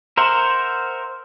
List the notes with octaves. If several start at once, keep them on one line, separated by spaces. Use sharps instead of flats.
A#4 C5 E5 F#5